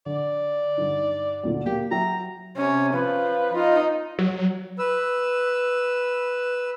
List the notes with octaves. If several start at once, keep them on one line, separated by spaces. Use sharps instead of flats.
D3 D5
G2 D3 D#4
D2 A#2 D3
A#3 G4
F#3 E5 G5 A#5
C3 C#4
F3 B4
D#4 F4
F#3
B4 E6